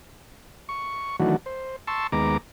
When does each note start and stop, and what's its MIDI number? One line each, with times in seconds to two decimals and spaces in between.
0.69 1.16 85
1.20 1.36 51
1.20 1.36 52
1.20 1.36 54
1.20 1.36 57
1.20 1.36 62
1.20 1.36 66
1.46 1.76 72
1.87 2.07 81
1.87 2.07 84
1.87 2.07 85
1.87 2.07 88
2.12 2.37 39
2.12 2.37 56
2.12 2.37 59
2.12 2.37 82
2.12 2.37 86